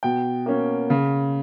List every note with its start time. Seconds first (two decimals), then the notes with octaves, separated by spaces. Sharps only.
0.03 B2 G5
0.46 A#3 C#4
0.90 C#3